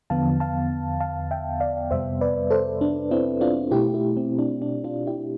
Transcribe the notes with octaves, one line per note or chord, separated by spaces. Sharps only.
E2 D3 F3 B3 F5 A5
F5 A5
F5 A5
E5 G5
D5 F5
F2 C3 G3 B3 C5 E5
B4 D5
A4 C5
D4
C4 E4
D4 F4
B2 A3 E4 G4
E4 G4
C4
D4
D4
D4 F4
E4 G4